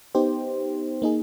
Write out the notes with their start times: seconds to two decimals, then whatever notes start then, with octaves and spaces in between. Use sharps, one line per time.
0.15 B3 D#4 G4 C5
1.02 A#3 D#4 G#4